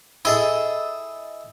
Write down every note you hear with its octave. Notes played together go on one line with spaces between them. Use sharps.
E4 G#4 A4 D#5